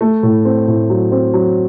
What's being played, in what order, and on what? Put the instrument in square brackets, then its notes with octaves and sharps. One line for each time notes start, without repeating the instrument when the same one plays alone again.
[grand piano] A3
A2
C4
A2
F#3
C4
F#3